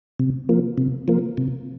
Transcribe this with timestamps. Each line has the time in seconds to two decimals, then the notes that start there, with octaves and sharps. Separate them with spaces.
0.19 C3
0.49 F3 A#3
0.78 C3
1.08 F3 A#3
1.37 C3